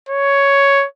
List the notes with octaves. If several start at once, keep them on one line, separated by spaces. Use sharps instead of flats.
C#5